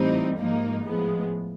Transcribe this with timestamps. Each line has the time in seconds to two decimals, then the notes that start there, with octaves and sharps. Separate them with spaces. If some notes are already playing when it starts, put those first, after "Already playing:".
Already playing: A2 E3 G3 C4 D#4
0.38 G#2 F3 A#3 D#4
0.85 A2 F3 G#3 B3